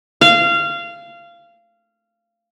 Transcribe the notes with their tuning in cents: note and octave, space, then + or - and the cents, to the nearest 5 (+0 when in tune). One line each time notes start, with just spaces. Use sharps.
F5 -20